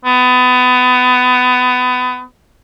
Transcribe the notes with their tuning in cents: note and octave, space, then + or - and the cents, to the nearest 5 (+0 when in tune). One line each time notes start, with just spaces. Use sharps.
B3 +25